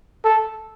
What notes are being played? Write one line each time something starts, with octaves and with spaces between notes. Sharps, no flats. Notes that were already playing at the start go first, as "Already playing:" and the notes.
A4